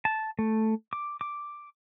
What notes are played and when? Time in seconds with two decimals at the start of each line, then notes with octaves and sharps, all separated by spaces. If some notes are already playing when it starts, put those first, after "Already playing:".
0.05 A5
0.39 A3
0.93 D6
1.21 D6